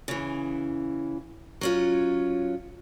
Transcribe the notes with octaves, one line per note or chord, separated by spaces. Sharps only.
C#3 E3
F#3 C#4 F4